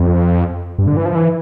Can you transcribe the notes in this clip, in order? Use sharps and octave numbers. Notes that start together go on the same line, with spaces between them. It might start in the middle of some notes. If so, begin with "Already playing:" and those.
Already playing: F2
G2
D3
E3
F3
E3